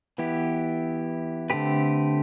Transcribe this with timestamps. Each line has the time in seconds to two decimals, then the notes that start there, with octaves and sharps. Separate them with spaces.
0.18 E3 B3 E4 G4
1.50 D3 A3 C4 G4 B4